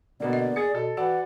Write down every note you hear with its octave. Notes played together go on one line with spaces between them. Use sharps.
B2 D3 A#3 B3 D5
D#5
G#4 A6 C#7
B2 A4
E3 F#4 D5 F#5